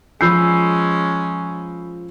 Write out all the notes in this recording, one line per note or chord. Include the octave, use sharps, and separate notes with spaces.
F3 G#3 C#4 B5 E6 G6 C7